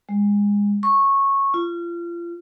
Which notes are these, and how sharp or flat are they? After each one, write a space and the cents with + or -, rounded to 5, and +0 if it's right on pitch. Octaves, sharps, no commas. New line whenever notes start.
G#3 -25
C#6 -15
F4 -30